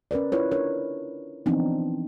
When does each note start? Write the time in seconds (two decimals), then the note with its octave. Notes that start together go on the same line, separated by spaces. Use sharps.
0.11 C#4 A#4 B4 D5
0.32 E4 F4 B4 C#5
0.51 D4 A#4 C#5
1.46 E3 F3 B3 C4 D4 D#4